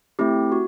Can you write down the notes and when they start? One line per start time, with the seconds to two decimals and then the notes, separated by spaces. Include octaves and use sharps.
0.19 A3 C4 E4 G4
0.52 F#4